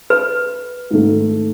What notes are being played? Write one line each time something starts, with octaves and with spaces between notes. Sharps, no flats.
B4
G#2 D#3 A3